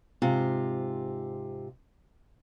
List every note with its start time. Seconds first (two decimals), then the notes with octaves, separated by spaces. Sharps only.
0.22 G#2 C3 F4